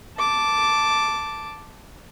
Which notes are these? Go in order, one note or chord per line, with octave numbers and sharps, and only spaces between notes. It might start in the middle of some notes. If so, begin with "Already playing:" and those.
A5 D6